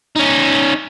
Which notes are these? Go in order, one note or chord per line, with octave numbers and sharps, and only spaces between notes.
C#4 D#4